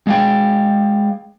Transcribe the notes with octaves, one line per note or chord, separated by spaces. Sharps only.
G#3 F5 G5